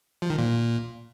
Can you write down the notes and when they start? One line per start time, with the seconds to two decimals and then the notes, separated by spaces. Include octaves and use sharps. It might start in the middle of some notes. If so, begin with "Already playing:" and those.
0.22 F3
0.30 D#3
0.38 A#2